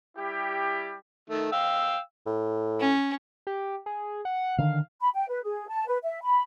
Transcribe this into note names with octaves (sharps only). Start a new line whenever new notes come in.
G3 E4 G4
D#3 A3
F5 G5 E6
A2
C#4
G4
G#4
F#5
D3 D#3 F5
B5
G5
B4
G#4
A5
B4
E5
B5